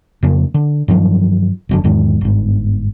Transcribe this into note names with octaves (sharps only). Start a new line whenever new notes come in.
F2 C#3 A#3
D3
G2 D#3 F3 F#3
F1 F#2 D3
E2 G#2 D#3 G#3
G1 G#2